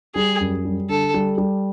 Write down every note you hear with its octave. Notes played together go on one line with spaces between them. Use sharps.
G3 G#4
F#2
G3
D3 A4
G3
G3